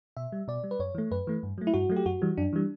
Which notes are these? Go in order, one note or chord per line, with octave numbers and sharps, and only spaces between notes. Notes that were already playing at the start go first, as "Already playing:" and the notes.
B2 E5
G3
B2 D5
G3
B4
F#2 C#5
E3 A3
F#2 B4
E3 A3
G2
F#3 A3
E4
G2 F#4
F#3 A3
G4
F#2 F#4
E3 G3
F#2 D4
E3 G3